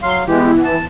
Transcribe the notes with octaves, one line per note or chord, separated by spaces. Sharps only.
F#3 F5 C6
E3 G#3 B3 G4
A5